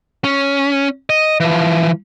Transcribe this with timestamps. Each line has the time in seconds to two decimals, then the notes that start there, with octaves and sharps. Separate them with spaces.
0.24 C#4
1.10 D#5
1.40 E3 F3